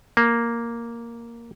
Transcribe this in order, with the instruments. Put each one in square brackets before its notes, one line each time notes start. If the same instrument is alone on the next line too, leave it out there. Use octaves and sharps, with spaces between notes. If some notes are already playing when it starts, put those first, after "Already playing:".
[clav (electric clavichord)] A#3